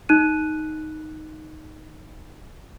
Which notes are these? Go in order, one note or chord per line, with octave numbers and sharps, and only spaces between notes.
D#4 F#6 D#7